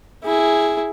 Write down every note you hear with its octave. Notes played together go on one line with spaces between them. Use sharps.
E4 G#4